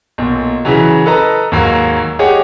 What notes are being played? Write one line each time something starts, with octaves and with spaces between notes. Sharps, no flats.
B1 A#2
C#3 E3 F#3
A4 B4 D#5 A#5
D#2 G#2 F#3 A#3
G4 G#4 C#5 D#5 F#5